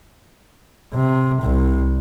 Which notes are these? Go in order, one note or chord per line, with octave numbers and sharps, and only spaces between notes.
C3
C2